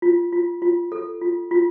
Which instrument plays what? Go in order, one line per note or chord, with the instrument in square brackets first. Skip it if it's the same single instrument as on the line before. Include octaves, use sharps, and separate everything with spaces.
[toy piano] F4
F4
F4
A4
F4
F4